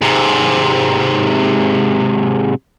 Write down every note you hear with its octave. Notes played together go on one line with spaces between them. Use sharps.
G#2 C3